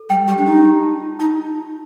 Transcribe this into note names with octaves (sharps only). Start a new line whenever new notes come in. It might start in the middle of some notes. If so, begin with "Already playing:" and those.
Already playing: A4
G3 G5
G3 G4
D4
D#4 G4
G4
A5
F4
D#4 A5